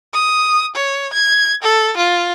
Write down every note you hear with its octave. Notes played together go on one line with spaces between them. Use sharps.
D#6
C#5
G#6
A4
F4